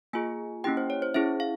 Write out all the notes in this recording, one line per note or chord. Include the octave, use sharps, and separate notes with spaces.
A#3 F4 G#4 G#5
A#3 C#4 E4 G4 G5
C5
C#5
C5
C#4 E4 G#4 E5
F5